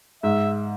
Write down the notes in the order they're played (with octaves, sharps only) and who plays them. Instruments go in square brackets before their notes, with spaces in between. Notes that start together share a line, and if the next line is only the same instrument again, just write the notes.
[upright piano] G#2 [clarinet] E5